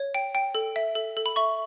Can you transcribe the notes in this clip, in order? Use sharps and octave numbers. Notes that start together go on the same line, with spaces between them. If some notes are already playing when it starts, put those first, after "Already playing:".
Already playing: C#5
G5
G5
A4
E5
A4
A4
B5
E5 C#6